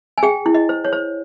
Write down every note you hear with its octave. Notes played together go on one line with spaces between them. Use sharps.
G#5
G#4 G5
E4
D#5
C5
C#5
C5